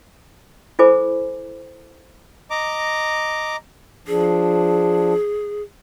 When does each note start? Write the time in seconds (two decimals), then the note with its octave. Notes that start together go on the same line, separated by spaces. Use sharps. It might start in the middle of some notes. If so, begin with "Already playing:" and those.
0.79 E4 A4 C5 G#5 B5 D6
2.50 D#5 A#5 D6
4.08 F3 D4 G#4